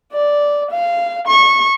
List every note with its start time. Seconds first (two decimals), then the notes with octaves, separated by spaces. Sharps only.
0.12 D5
0.71 F5
1.28 C#6